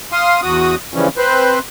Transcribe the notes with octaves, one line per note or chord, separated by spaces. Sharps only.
F5 C6 D#6
E2 F#4 D#6
C#3 E3 F3 G3 C#4
C4 B4 C5